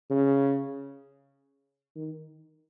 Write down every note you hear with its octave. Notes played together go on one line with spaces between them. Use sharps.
C#3
D#3